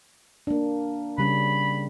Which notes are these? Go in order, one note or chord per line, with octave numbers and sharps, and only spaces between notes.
A#3 D4
C#3 G3 C#4 B5